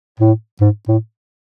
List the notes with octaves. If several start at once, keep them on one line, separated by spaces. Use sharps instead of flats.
A2
G#2
A2